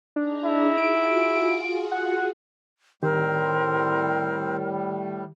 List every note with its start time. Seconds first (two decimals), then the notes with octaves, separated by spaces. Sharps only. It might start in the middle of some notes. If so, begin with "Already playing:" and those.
0.16 D4 D#4 G#4 A#5
0.44 E4
0.77 F4 F#4 G#4 D7
1.92 F#5
3.03 A2 D#3 G3 C4 G4 A#4 C5